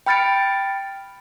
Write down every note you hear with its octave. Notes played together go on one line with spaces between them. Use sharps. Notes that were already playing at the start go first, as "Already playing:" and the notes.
G5 B5 F6 A6 C#7 D7